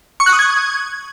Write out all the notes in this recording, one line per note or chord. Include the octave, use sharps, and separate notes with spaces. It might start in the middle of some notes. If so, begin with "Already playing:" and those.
C#6
F#6
D#6
G#6